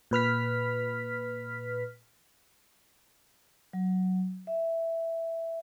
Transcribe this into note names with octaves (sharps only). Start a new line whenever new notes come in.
A#2 B4 F6 B6
F#3
E5